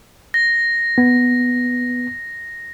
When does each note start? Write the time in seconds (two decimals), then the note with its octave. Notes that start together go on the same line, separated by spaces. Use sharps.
0.34 A#6
0.98 B3